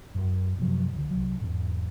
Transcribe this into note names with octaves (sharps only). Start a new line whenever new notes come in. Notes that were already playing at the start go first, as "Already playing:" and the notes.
F#2
F#2 C3 F3 F#3
C#2 D3
C2 F#3
E2 G#2